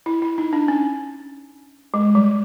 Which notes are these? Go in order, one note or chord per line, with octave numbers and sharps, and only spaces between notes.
E4
E4
D#4
D4
C#4
G#3
G3